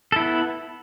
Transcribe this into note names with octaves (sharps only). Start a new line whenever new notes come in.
B3 E4 A4